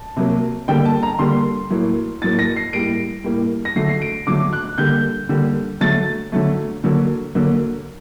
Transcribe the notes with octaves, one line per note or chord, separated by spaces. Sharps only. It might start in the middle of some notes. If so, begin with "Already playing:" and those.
Already playing: A5
C3 F#3 A#3
D3 G3 A#3 G5
A5
A#5
D3 G3 A#3 C6
A2 F#3 A#3
A2 F#3 A#3 A6
A#6
C7
A2 G3 A#3 D7
A2 G3 A#3
A#6
D3 F#3 A3 C7
C7
D7
D3 F#3 A3 D6
F#6
D3 G3 A#3 G6
D3 G3 A#3
D3 F#3 A3 A6
D3 F#3 A3
D3 F#3 A#3
D3 F#3 A#3